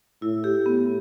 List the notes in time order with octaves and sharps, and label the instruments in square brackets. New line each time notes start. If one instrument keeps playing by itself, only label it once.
[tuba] A2 [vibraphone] E4
[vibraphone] G4
[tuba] A2 [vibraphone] B3